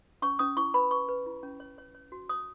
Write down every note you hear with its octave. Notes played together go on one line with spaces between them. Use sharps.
C#4 C#6
C#4 D#6
E4 C#6
B4 B5
B4 C#6
B4
E4
C#4
C#5
C#5
C#5
F#4
C#5 D#6